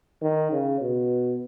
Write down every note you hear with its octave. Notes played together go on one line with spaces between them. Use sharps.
D#3
C#3
B2